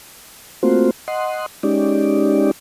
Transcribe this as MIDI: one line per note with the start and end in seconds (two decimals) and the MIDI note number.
0.63 0.91 57
0.63 0.91 58
0.63 0.91 60
0.63 0.91 65
0.63 0.91 66
0.63 0.91 72
1.08 1.46 75
1.08 1.46 78
1.08 1.46 84
1.63 2.51 56
1.63 2.51 61
1.63 2.51 63
1.63 2.51 67
1.63 2.51 74